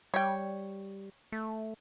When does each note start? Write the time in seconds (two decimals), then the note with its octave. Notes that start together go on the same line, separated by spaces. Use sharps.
0.14 G3 C#5 G5
1.32 A3